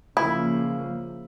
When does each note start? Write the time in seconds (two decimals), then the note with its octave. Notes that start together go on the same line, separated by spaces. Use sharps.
0.17 C#3 F3 A#3 E4